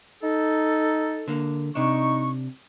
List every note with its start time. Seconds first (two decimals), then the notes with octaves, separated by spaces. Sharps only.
0.22 D#4 A4
1.28 D3 A#3
1.75 C3 D4 D#4 C#6